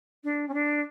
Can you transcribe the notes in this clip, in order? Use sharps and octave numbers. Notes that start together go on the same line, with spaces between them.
D4
C#4
D4